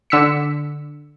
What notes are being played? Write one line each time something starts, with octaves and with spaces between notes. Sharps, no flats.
D3 E6 B6 C#7